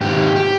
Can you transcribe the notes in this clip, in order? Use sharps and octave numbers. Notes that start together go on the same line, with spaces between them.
G#2 D#3 G4
G4